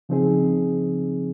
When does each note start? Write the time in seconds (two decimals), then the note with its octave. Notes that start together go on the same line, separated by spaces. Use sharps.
0.09 C#3 F3 C4 D#4 G#4